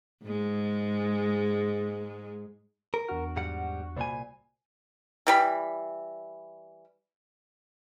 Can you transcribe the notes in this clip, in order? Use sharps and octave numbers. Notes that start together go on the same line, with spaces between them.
G#2 G#3
A#4
E2 D4 F#4 F6
G#2 G3 F#5
C2 A#2 C5 D5 G#5 B5
E3 G3 B5